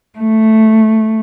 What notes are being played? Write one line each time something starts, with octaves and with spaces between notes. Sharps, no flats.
A3